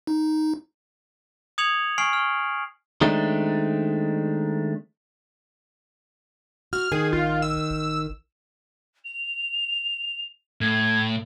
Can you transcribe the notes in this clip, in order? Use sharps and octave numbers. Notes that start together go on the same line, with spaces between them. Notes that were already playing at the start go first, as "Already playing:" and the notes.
D#4
D#6 G#6 C#7 F7 F#7
G#5 C#6 F6 C7 D7 F#7
C#6 F6
D#3 G#3 A3 C4 D4 D#4
F#4 F6
D#3 G#4
A#1 F4
E6
A1
F7
A2 G#6